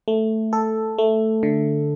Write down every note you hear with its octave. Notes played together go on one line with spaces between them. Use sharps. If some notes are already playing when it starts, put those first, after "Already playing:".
A3
A4
A3
D3